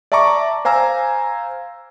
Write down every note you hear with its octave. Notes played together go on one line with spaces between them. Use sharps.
D5 E5 A5 A#5 C#6 D6
C5 F5 G#5 A#5 E6